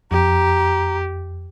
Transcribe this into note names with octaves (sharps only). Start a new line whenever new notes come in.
F2 G4 A#5